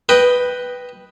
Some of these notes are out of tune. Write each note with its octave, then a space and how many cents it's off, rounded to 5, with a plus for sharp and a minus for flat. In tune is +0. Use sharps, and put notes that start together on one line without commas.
B4 +0 D#5 +0 G5 +0